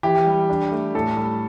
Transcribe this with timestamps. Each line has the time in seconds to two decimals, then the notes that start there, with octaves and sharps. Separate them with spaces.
0.03 E3 G4
0.26 G3
0.49 D4
0.71 A3
0.94 A2 A4
1.17 G3